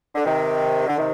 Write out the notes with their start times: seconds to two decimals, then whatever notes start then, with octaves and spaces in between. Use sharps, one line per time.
0.15 D3
0.25 C3 D#3
0.87 D3
0.97 C3 D#3